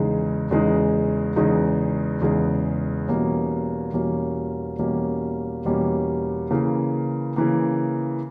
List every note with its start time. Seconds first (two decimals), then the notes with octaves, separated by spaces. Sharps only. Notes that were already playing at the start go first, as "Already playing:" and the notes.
Already playing: E2 C#3 G#3 D#4
0.51 E2 C#3 G#3 D#4
1.36 E2 C#3 G#3 D#4
2.22 E2 C#3 G#3 D#4
3.08 E2 B2 G3 A#3 C#4
3.93 E2 B2 G3 A#3 C#4
4.79 E2 B2 G3 A#3 C#4
5.65 E2 B2 G3 A#3 C#4
6.51 C#3 E3 A#3
7.36 C#3 E3 A#3